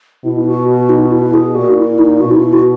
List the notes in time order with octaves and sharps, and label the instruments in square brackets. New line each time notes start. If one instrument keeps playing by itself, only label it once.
[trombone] B2 [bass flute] E4
[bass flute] E4
F#4
F#4
D#4
F#4
E4
G#4
[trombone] A#2 [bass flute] F#4
[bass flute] D#4
E4
D#4
[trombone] B2 [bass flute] F#4
[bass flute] D#4
E4
F#4